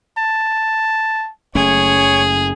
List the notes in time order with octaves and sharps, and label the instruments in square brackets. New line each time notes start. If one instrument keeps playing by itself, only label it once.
[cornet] A5
[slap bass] F#1 A3 C#4 [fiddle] G#4 [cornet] C#5